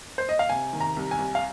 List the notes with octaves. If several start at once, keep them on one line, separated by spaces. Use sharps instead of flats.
C5
D#5
F5
C3 G#5
D#3
A#5
C2
G#5
C2
F5